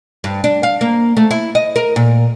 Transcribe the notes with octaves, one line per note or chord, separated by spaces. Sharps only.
G2
D4
F5
A#3
A3
E4
D#5
A#4
A#2